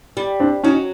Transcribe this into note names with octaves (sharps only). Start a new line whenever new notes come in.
G3
C4 D4
F#3 C#4 D#4